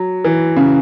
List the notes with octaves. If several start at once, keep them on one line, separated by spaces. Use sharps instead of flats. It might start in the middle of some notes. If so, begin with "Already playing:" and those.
Already playing: F#3
E3
C#3